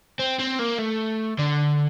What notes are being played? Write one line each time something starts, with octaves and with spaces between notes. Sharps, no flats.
C4
C4
A#3
A3
D3